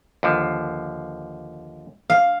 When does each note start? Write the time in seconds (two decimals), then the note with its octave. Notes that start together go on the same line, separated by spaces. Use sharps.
0.23 D#2 D3 F3
2.10 F5